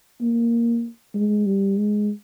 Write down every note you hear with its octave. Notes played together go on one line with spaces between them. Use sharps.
A#3
G#3
G3
G#3